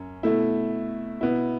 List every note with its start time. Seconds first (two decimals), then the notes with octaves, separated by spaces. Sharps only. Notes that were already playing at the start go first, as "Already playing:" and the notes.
Already playing: F#2 C#4
0.23 B2 A3 E4
1.21 B2 B3 E4